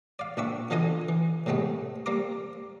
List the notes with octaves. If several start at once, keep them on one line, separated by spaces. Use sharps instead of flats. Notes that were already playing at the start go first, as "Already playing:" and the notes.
D5 F5
A#1 C4 D4 E5 C#6
B2 D3 E3 F4 D#5 G#5
E3
A2 C3 G#3 A3 B3
G3 A#3 C4 A#4 A#5 D6